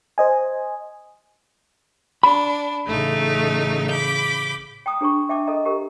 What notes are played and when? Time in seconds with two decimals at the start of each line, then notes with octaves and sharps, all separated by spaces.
0.18 C5 D#5 G#5
2.23 D4 B5
2.86 A1 C#3 A3 D#4
3.89 B5 D6 G6
4.86 G5 A#5 D#6
5.01 D4 G#4 A#5 C#6
5.29 E5 G5 A5 D6
5.47 A4 D#5 A#5
5.65 G4 A#4 A#5